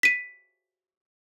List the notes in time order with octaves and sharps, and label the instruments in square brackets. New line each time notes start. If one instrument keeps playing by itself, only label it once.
[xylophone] B6 D#7